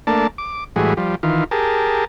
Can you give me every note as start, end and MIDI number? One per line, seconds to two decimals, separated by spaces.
0.07 0.27 57
0.07 0.27 58
0.07 0.27 62
0.07 0.27 81
0.38 0.64 86
0.76 0.94 45
0.76 0.94 52
0.76 0.94 55
0.76 0.94 56
0.76 0.94 66
0.76 0.94 68
0.97 1.15 53
0.97 1.15 55
1.23 1.44 51
1.23 1.44 52
1.23 1.44 65
1.51 2.05 67
1.51 2.05 68
1.51 2.05 70
1.51 2.05 81